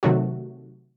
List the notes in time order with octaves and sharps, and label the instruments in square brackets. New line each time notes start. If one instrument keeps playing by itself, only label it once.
[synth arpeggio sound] C3 D#3 F#3 A3 F#4